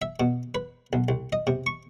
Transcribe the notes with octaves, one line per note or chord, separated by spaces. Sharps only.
E5
B2
B4
B1
C2
D#5
C3
C#6